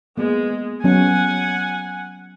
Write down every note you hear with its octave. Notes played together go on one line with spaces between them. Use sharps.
G#3 A#3 B3
F#3 B3 C#4 F#5 G#5